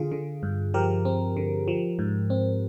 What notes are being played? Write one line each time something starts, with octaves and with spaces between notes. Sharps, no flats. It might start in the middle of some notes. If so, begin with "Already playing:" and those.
Already playing: D3 F4 G#4
D3
G2
F3 G4 A#4
C4
D3
F3
G#2
C4